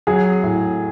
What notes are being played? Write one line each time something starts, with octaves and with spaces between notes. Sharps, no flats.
F#3 G#4 G#5
A2